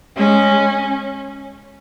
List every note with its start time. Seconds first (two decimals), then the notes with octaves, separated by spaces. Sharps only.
0.16 G#3 C#4